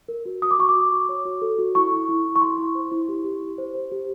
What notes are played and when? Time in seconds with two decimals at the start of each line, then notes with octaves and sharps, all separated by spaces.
0.08 A#4
0.26 F#4
0.42 F#4 D#6
0.51 D6
0.59 F#4 C#6
0.69 D6
0.75 F#4
0.92 F#4
1.09 C#5
1.25 F#4
1.42 A4
1.58 F#4
1.75 E4 C#6
1.92 E4
2.09 E4
2.25 E4
2.36 C#6
2.42 E4 C6
2.58 E4
2.75 C5
2.92 E4
3.09 G4
3.24 G4
3.41 G4
3.58 C5
3.75 C5
3.92 G4